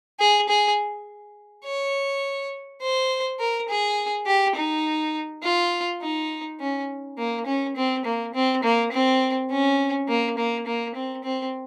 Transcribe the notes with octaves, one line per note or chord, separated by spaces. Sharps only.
G#4
G#4
C#5
C5
A#4
G#4
G4
D#4
F4
D#4
C#4
A#3
C#4
C4
A#3
C4
A#3
C4
C#4
A#3
A#3
A#3
C4
C4